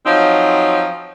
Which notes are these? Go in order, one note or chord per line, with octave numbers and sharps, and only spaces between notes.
F3 F#3 C4 D#4